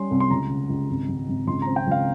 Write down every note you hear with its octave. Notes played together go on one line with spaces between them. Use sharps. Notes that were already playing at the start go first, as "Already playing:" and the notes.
Already playing: G3 C#4 C6
C2
C6
C#2 A#5
C#3
C#2
G#1
G#1
G#1
C#2 C6
C4 A#5
G5
C#2 F5